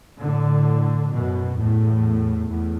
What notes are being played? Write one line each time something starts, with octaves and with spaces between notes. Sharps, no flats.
A2 D3
F#2 B2
E2 A2
E2 A2